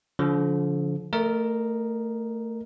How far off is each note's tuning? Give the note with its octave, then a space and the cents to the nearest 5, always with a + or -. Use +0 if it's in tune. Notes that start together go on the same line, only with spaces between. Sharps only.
D3 -40 F3 +0
A3 +25 A#4 +0 D#5 -20